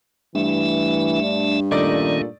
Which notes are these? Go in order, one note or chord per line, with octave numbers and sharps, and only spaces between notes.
G2 E3 A3 E5
D4
A#2 D#3 A3 C#4 D#4 D5